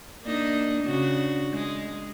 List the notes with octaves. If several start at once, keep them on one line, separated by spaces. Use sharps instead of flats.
A#3 D4 D#4
C#3 D4 F#4
G#3